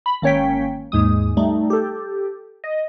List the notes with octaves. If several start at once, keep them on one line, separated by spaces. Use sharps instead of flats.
B5
G#1 A#3 C#4 C#5 G5 B6
D#2 G#2 G#3 D#6
G3 A3 D#4
G4 A4
D#5